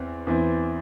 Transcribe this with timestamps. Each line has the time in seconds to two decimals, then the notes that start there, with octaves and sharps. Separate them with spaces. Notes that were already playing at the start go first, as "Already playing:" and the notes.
Already playing: E2 E3 C4
0.27 E2 E3 C4